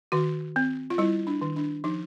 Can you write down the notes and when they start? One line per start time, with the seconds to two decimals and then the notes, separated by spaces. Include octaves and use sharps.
0.12 D#3 F#4
0.56 C4
0.90 F4
0.98 G3 E4
1.27 D4
1.42 D#3
1.56 D4
1.84 F3 D#4